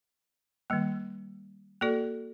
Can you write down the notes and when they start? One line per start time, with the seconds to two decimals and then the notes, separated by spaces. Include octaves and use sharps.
0.70 D#3 G3 A#3
1.81 A#3 F#4 A4 D5